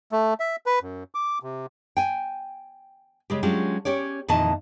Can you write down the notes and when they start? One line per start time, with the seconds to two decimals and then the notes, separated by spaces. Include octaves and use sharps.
0.12 A3
0.40 E5
0.66 B4
0.82 F#2
1.15 D6
1.43 C3
1.97 G5 G#5
3.30 C#3 G#3 G4
3.43 F#3 G#3 C#4 D4 F4 G4
3.85 C#4 G4 C#5 D5
4.28 F2 A#2 D#3 E3 D#5 A5